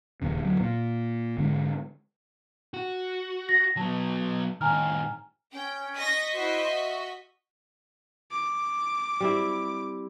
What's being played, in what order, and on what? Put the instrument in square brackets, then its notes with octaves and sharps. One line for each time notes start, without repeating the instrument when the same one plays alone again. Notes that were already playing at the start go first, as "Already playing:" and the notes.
[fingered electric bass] D#1 A#1 D#2 C#3
D2 F#3
A#2
G#2 D3 G#3 D4
[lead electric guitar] F#4
[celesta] A#6
[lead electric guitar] F#3 B3 [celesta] A5
[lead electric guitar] A2 D#3 [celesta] G#5 A#5 F6
[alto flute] C#4 [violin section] G5
[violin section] D#5 C#6 B6 [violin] D#6 A#6
[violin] E4 C5 [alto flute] F#4
[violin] F#4 [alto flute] E5
[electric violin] D6
[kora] G3 C4 E4